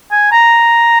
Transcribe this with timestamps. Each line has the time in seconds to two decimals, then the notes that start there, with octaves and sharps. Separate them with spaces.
0.12 G#5
0.32 A#5